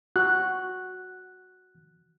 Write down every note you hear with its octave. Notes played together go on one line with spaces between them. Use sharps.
F#4 F#6